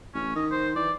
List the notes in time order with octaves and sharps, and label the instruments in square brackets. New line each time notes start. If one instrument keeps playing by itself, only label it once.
[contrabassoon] A1 [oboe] C#4
[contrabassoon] D#3 [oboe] D#5
[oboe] C5
[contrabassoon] E3 [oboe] D5